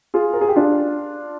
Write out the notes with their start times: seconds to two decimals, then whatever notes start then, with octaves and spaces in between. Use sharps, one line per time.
0.14 F4 G#4
0.34 A#4
0.41 G#4
0.49 G4
0.56 D4 F4